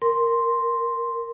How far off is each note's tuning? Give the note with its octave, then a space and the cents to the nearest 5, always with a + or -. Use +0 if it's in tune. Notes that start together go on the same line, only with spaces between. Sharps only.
A#4 +0 C6 +0